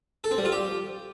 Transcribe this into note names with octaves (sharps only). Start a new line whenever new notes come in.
A4
C4
G3
F4
G4